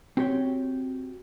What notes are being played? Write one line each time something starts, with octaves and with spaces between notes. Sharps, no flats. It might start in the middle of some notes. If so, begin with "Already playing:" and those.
C4 F#4 G4 C#5 G5